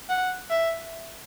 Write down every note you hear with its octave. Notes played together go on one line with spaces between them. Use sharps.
F#5
E5